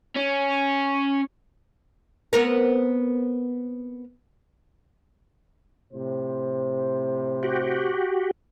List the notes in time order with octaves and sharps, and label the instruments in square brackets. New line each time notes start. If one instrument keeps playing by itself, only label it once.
[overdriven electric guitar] C#4
[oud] B3 C4 A#4
[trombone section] A2 C3 C5
[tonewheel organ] F#4 G4